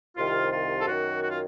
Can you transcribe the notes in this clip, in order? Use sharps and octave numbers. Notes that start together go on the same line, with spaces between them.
C2 C3 D#3 F4
F4
A4
F#2 D#3 F#4
F#4
F4